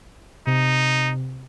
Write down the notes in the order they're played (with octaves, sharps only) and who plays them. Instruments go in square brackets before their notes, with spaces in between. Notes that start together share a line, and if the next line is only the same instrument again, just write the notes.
[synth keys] C3 [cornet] D#4